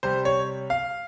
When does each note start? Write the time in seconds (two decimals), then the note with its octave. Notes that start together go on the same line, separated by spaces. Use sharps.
0.03 C3 G3 C5
0.25 C#5
0.70 F5